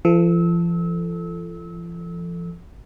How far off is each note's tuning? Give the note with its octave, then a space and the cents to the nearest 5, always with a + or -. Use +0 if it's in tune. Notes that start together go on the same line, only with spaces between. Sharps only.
F3 -40 A4 +0 E6 -30